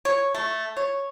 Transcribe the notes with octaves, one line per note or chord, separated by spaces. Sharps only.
C#5
A3
C#5